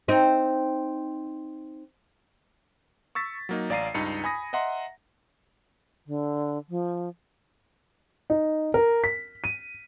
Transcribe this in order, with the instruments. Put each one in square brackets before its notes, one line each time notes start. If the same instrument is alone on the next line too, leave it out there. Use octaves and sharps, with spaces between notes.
[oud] C4 D#4
[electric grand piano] C#6 E6 A6 B6
F#3 A#3 D#4
A1 D5 F5 A#5 C7 D#7
C#2 G2 D#4 D#5 C#7
G#5 B5 D#6 A#6
D#5 E5 F#5 A#5 C6
[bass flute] D3
F3
[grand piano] D#4
A#4
B6
D#7